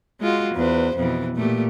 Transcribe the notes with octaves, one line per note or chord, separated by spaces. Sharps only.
G#3 F4 F#4
E2 B4 C5
F2 B2 E3
A#2 A3 G4